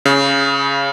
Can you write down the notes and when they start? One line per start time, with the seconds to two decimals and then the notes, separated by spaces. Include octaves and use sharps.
0.06 C#3